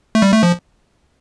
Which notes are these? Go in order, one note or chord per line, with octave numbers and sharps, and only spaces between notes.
A3
G3
A3
F3